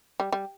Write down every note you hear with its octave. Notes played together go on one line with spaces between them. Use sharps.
G3
G3